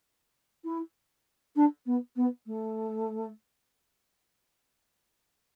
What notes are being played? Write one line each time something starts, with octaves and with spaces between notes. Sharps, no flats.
E4
D4
B3
B3
A3